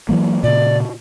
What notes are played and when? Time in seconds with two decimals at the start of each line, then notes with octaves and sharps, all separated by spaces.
0.09 E3 F#3 A#3
0.43 A#2 C#3 D5